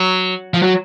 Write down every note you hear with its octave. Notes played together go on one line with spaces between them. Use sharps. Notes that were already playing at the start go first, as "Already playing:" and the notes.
Already playing: F#3
F3
F#3